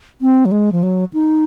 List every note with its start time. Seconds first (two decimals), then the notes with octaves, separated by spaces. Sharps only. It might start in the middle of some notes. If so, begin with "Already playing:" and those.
0.21 C4
0.45 F#3
0.51 G#3
0.72 F3
0.83 F#3
1.13 D#4